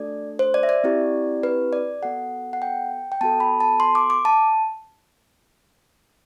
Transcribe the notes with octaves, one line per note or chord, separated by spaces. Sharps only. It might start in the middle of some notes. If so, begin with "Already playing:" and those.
Already playing: A3 D4 F#4 A4 D5
C5
D5
E5
D5
C4 E4 G4
B4
D5
B3 F#4 A4 F#5
F#5
G5
G5
B3 F#4 A4 A5
B5
A5
C6
D6
D6
A5